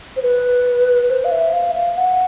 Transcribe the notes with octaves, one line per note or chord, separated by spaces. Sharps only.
C5
B4
C5
F5
E5
F5
F5
F#5